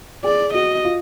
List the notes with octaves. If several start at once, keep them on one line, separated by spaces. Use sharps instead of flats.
G#4 D5
F#4 D#5
F4